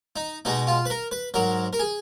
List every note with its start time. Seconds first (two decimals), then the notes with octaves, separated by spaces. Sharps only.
0.16 D#4
0.45 B2 G#3 D#4
0.67 F4
0.86 B4
0.90 A#4
1.11 B4
1.34 G#2 F#3 A#4
1.73 A#4
1.79 G#4